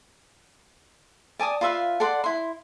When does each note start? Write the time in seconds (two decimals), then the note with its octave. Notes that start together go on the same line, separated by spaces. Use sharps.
1.39 D5 G#5 A5 D#6
1.61 F4 B4 E5 F5
2.00 A4 D5 F#5 C6
2.24 E4 C6